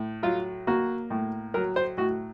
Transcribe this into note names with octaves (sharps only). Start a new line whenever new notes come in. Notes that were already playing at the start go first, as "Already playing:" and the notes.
Already playing: A2
F#3 F4
A#3 F#4
A2
F#3 A#4
C5
A2 F#4